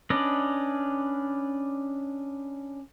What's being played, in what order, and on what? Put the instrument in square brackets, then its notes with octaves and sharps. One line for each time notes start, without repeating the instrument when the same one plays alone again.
[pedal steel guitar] C#4 D4 B4 D5 D#5